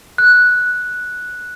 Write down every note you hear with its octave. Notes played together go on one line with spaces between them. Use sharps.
F#6